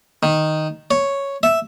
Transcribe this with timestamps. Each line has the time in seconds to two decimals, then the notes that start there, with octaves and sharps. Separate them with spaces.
0.23 D#3
0.91 C#5
1.43 E5